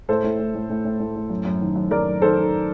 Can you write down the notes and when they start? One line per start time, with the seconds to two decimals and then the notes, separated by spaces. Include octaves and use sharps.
0.09 A2 A4 C5
0.24 A2
0.39 A2
0.55 A2
0.70 A2
0.85 A2
1.00 A2
1.16 A2
1.30 F#2
1.45 F#2
1.61 D#3
1.76 F#2
1.91 F#2 A#4 D5
2.07 F#2
2.22 D#3 A4 C5
2.37 D#3